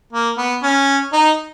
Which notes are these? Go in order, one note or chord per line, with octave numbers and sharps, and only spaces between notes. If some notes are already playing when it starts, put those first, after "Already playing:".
A#3
B3
C#4
D#4